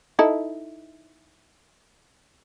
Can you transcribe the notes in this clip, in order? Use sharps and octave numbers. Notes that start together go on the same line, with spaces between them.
D#4 E4 A4